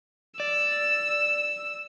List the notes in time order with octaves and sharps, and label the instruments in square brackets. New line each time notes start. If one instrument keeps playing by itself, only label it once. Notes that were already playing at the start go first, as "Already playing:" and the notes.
[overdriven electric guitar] D5 [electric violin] E6